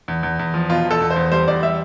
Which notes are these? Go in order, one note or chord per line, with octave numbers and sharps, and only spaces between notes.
E2
E2
E2
F3
B2 F4
E2
A4
E2
C5
E2
G3 C5
E2 D5
G3 E5